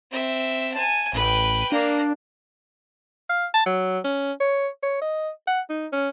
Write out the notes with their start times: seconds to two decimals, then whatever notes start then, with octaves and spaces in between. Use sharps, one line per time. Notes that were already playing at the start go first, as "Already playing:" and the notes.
0.11 C4 E5
0.74 G#5 A5
1.13 A1 B4 G5
1.72 A#3 D4
3.30 F5
3.54 A5
3.66 F#3
4.04 C#4
4.40 C#5
4.83 C#5
5.02 D#5
5.47 F#5
5.69 D#4
5.92 C#4